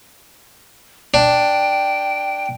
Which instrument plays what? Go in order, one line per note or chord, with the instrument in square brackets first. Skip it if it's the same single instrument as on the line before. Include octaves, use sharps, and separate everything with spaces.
[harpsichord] D4 [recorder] G5